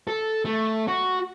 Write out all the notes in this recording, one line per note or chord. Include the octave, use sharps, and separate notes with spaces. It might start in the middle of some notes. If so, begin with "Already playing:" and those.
A4
A3
F#4